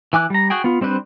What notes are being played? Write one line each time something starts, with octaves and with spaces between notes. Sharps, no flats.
E3 G#5 D6 F#6
G3 A#5
F#4 G#4 G5
B3 F4
G3 C4 D4 B4 C5